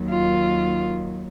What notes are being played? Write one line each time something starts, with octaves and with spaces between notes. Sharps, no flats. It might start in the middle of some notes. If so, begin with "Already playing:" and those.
Already playing: D#2 D#3 F#3
F4